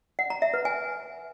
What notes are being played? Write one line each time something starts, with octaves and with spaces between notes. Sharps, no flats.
F#5
A#5
E5
B4
G#5